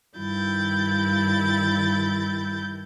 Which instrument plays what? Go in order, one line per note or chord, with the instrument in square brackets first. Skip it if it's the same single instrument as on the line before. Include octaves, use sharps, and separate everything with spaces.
[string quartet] G2 D#3 E4 G6 A6